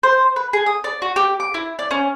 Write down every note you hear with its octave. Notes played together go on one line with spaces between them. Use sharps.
C5
B4
G#4
D#6
D5
F#4
G4
D6
E4
D5
C#4